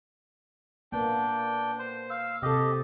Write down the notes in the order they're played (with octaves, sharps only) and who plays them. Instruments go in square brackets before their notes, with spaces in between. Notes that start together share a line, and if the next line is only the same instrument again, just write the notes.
[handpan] A#3 B3 [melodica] D4 G5
[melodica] C5
F5 E6
[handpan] C3 A4 [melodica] G4 D#5